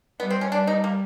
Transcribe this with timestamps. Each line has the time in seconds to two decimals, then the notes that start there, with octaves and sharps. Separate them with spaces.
0.20 G3 B3
0.30 C4
0.41 C#4
0.52 G3 D4
0.67 D#4
0.84 A#3